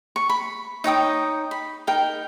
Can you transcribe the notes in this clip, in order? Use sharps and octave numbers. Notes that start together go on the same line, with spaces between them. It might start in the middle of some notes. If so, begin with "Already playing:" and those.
C#6
B5
D#4 C#5 G5 D#6
B5
D#4 A#4 G5